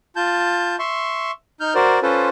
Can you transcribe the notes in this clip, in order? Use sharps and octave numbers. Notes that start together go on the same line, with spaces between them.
F4 A5 G6
E5 C6 C#6
D#4 F6 G6
F#4 A#4 C5 D5
C#4 F4 A4 B4 C5